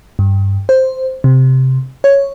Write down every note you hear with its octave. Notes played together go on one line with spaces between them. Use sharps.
G2
C5
C3
C#5